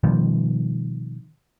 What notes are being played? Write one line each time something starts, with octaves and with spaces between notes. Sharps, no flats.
B2 D#3 F3 G3